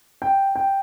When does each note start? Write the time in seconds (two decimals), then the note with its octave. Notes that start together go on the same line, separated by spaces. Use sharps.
0.22 G5
0.56 G5